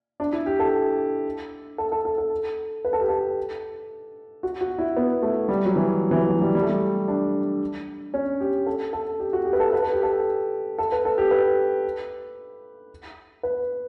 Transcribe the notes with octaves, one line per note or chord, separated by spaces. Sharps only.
D4
E4
G4
A4
A4
A4
A4
A4
B4
A4
G4
A4
F#4
F#4
E4
B3
A3
G3
F#3
E3
E3
F#3
F#3
G3
G3
A3
G3
D4
C#4
G4
A4
A4
G4
F#4
G4
B4
A4
B4
A4
G4
A4
A4
B4
A4
G4
B4
B4